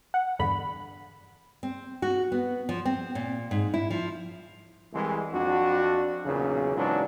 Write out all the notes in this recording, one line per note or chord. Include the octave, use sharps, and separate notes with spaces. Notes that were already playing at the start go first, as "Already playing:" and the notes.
F#5
E2 G2 D3 B5
C4
F#4
B3
F3
C4
A#2
G#2
E4
F3
C2 E3 G#3
F2 D4 F#4
B1 E2 A#2 C#3
G#2 C#3 E3 F#3 D4 F4